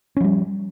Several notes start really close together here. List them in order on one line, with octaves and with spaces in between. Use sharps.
C#4 F3 G3